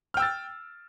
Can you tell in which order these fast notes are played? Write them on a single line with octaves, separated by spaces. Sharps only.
F6 G5 E6 A6